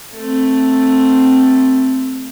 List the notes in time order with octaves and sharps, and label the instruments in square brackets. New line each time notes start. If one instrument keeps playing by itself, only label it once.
[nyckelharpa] A3 C4